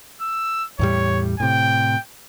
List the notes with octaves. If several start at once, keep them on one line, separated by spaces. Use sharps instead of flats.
E6
E2 A2 G3 C#5
A2 C3 G5